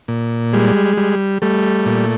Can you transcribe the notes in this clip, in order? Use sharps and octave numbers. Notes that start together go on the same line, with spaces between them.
A#2
G3 G#3
G3
G3 A3
A#2